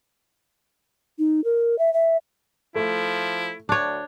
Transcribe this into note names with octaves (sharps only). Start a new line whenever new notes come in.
D#4
A#4
E5
E5
F3 A3 E4
D2 D4 C#5